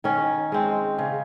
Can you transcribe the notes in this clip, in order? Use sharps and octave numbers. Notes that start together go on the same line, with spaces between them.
D#3 C#4
G#3 C4
C#3